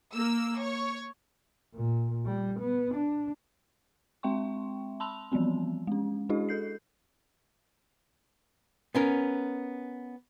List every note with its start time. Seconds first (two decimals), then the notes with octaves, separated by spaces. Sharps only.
0.14 A#3 E6
0.59 C#5
1.75 A#2
2.26 G3
2.60 B3
2.95 D4
4.23 G#3 C4 E5 G5 C6 C#6
5.00 A5 B5 C6 E6 F7
5.32 E3 F3 G3 B3 C4
5.87 G#3 C#4
6.29 G#3 D4 E4 F#4 G#4 D#5
6.49 A4 G6 C7
8.95 B3 C#4 A#4